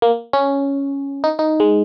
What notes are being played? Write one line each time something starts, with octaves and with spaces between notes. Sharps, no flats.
A#3
C#4
D#4
D#4
G#3